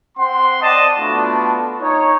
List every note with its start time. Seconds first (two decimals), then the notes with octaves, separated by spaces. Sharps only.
0.18 C4 F#5 C6
0.61 C4 D5 D#5 F#5 A5
0.98 A3 B3 D4 F4 F#4
1.82 D#4 C#5